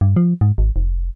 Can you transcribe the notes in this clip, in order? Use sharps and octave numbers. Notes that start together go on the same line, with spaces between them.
G2
F3
G#2
G#1
F1